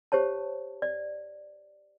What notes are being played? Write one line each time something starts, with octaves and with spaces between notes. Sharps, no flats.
G4 C5 C#5 A5
D5